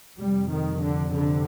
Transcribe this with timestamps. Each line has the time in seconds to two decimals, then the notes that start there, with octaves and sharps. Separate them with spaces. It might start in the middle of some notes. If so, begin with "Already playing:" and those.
0.18 F2 C3 G3
0.49 D#3
0.80 D3
1.12 D3